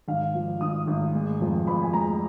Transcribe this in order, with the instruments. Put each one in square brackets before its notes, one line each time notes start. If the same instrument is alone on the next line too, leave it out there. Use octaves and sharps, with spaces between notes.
[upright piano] G#1 F5
F3
G#1 D#6
G#1
G#3
F2
F2 B5
G#5
G#3 A#5